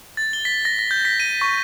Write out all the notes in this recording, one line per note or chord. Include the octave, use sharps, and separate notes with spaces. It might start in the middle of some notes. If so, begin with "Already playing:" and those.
A6
G7
B6
A#6
A#6
G6
B6
D#7
C#6